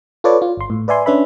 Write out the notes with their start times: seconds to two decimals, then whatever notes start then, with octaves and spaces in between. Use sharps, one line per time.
0.24 F4 A4 B4 C#5 D5
0.42 F4
0.57 G1 C6
0.70 A2
0.88 B4 D5 E5 G#5 C6
1.06 C#4 D4 B4 E5 B5